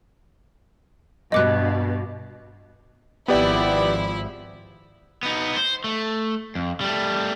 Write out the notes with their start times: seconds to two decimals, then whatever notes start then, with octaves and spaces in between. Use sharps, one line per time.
1.32 G2 B2 D#5 D6 F#6
3.28 G#1 F3 B3 E4 G4 D5
5.23 B3 D#4
5.56 C5
5.84 A3
6.55 F2
6.81 G3 A3